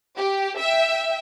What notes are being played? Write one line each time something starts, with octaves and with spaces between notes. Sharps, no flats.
G4
E5 G5